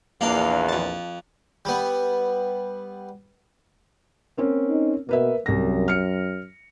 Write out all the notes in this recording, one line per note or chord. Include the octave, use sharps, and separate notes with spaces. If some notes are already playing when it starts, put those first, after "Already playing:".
A#1 E2 A#3 D4 F5
F2 A5
G3 B3
A#3 C4 C#4
D#4
B2 A#3 B4 E5
C2 F#2 A#6
F6 C#7